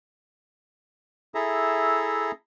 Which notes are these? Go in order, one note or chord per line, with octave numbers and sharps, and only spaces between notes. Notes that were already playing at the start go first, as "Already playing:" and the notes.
E4 G#4 A4 E5 A#5